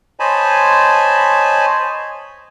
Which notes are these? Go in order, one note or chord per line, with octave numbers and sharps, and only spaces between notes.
C5 C#5 D#5 G#5 A5 B5